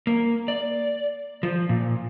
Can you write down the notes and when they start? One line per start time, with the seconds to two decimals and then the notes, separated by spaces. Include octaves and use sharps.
0.07 A#3
0.48 D5
1.43 F3
1.69 A#2